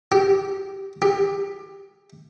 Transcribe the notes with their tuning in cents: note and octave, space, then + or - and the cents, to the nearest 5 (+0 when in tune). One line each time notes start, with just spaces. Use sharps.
G4 -10
G4 +20